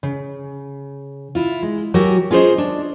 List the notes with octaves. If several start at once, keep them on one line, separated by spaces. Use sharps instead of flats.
C#3
E4 F4
G#3
F#3 F#4 G4 A#4 G#5
C#4 F4 G#4 A#4 C5 D#5
D4